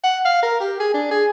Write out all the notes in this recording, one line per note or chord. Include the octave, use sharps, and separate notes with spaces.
F#5
F5
A#4
G4
G#4
D4
G#4